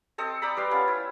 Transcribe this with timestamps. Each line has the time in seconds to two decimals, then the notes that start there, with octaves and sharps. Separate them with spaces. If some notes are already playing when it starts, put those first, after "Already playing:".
0.18 C4 A4 D#5
0.42 D5 G5 A#5 B5
0.57 G3 B4 C6
0.71 B3 C#4 F4
0.88 E4